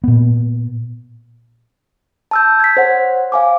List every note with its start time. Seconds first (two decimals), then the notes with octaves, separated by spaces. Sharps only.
0.04 A#2 B3
2.31 A5 E6 G6
2.60 G#6 B6
2.77 C5 C#5 F#5
3.32 F5 G#5 D6